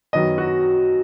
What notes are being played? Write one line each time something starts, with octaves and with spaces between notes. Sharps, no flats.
F#2 D#3 F#3 B3 D#5
F#4